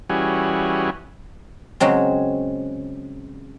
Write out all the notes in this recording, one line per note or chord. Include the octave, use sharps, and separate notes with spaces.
E3 G3 C#4 F#4 G#4
C#3 F#3 G#3 C4